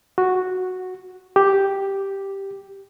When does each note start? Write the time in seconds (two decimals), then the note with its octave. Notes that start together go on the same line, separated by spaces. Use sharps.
0.18 F#4
1.36 G4